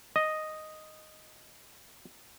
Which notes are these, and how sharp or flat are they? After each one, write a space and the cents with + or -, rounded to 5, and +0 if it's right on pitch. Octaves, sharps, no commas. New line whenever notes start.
D#5 +0